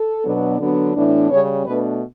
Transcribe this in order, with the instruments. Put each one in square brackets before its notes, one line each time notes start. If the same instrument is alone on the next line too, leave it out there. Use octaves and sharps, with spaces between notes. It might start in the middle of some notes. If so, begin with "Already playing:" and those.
Already playing: [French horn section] A4
B2 F#3 B3 D4
D3 F#3 B3 D4
A2 E3 B3 D4
C#3 G3 C#4 C#5
B2 A3 D4 B4